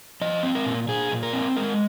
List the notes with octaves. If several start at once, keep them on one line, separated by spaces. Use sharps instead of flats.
F3 D#5
C4
A#4
A#2
A#2 G#4
A#2
A#4
C4
G#3 A#4